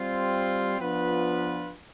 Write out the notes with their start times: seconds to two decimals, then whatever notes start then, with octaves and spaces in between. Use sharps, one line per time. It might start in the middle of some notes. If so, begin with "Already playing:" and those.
Already playing: G3 C4 F4
0.79 F3 B3 D4 F4 B4